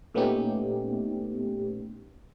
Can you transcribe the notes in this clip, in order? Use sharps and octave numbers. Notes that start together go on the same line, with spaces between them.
A#2 A3 B3 C#4 D#4 G4